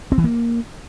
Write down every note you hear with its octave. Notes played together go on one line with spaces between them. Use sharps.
C4
E3
A#3